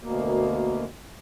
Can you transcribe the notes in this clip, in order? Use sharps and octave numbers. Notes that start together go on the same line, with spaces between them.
D2 B2 A#3